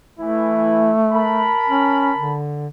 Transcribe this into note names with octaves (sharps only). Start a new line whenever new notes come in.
E3 A3 E4
A#4 A5 B5
C#4
D3